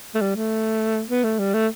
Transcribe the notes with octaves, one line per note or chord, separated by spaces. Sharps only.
A3
G3
A3
B3
A3
G3
A3